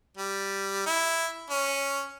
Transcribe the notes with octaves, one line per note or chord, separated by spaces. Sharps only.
G3
E4
C#4